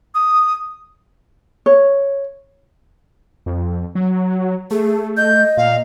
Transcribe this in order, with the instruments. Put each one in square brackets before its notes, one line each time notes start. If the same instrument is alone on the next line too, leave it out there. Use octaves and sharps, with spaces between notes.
[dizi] D#6
[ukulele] C#5
[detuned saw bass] F2
F#3
[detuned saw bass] A3 [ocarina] G#4
[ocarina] D#5 [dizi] G6
[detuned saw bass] A#2 [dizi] F5